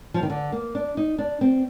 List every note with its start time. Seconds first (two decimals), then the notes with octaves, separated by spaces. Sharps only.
0.14 F3
0.23 D#3
0.30 D3
0.52 A#3
0.75 D4
0.97 D#4
1.18 D4
1.41 C4